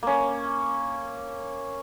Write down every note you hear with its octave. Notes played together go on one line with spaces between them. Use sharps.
A#3 C#4